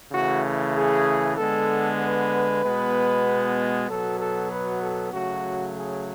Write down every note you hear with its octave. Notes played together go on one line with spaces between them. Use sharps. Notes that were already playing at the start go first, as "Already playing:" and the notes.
C#3 E3 A3 F#4
G#4
D3 G#3 B3 A4
B4
B2 G#3 B3
B2 F#3 B3 A4
A4
B4
A4
C#3 F#3 A3 F#4
G#4